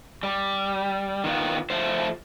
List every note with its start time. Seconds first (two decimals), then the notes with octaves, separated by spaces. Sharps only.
0.23 G3
1.24 D#3 B3 F4
1.70 F3 A3 C5